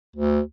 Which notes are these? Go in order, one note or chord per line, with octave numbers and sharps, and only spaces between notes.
D2